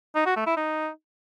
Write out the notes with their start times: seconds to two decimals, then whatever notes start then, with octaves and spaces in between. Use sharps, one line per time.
0.15 D#4
0.26 F#4
0.36 A3
0.47 E4
0.57 D#4